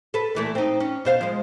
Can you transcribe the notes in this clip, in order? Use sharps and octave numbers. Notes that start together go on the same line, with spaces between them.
A4 B4
A#2 E3 A3
C4 D#4
C#4
B2 C5 F5
F3 G#3